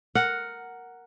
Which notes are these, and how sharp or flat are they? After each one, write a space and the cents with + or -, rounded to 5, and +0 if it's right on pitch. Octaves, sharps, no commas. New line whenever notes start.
A#4 +0 F#5 +0